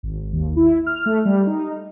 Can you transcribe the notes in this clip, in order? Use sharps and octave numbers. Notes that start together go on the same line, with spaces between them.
G#1
D#2
E4
F6
A3
G3
D#4